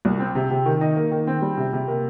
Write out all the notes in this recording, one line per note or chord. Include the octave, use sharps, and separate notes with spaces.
C2
C4
C3
C3
D#3
D#4
A#3
D#3
C4
G3
C3
C3
A#3